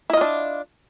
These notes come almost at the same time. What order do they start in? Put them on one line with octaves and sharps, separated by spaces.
E4 D#5 F4 D4